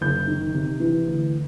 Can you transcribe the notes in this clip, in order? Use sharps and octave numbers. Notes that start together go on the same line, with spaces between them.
F#1 G6
D#3
C3
E3
D2